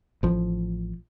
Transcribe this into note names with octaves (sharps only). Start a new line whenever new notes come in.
A1 F3